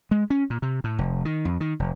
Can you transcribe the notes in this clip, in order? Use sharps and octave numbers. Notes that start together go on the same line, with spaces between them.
G#3
C#4
A#2
C3
A2
F1
D#3
F2
D#3
F1